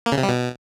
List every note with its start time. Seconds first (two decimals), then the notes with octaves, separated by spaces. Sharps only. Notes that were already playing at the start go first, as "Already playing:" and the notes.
0.06 A#3
0.12 C#3
0.17 C3
0.23 G3
0.29 B2